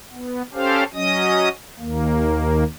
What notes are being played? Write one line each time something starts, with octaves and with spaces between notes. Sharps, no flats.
B3
C#4 G4 A4 C5 F5
F#3 C#4 D#5 D#6
D#2 A#3